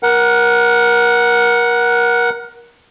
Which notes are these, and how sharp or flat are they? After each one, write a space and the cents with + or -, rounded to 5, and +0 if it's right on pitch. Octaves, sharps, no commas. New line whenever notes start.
A#4 +25 F#5 +0